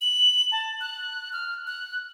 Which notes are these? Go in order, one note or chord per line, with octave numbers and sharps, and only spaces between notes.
F#7
A5
F#6
F6
F#6